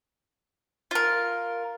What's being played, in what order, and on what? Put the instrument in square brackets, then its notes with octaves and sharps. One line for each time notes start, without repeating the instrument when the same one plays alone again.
[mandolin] F4 A#4